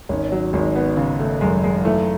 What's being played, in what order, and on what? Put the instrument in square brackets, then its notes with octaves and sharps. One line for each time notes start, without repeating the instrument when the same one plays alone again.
[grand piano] G#1 [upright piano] C#4
[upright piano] F#3
[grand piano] G#1 [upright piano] G#3
[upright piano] B3
[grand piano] C#3
[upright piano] A3
[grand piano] F#2 [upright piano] G#3
[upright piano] G#3
[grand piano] E3 [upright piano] A3